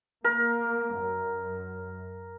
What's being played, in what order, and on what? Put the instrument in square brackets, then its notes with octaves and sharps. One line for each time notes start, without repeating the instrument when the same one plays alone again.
[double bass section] A#3 [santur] A#4
[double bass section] F#2